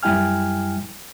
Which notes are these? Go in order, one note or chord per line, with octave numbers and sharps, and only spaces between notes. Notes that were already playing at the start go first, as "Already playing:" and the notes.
F#2 G3 E4 G5 G#5 F6